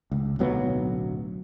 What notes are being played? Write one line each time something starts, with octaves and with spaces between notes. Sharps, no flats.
C#2
D1 B1 F#3 B3